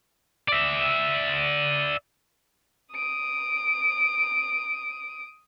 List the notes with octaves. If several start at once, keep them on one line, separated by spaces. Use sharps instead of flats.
D5 E5
D#6 D7